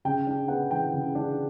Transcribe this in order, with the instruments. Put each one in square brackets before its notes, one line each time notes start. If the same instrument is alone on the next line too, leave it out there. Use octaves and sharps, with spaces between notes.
[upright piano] C#3 G5
D4
B3 F#5
E3 G5
C#3
D4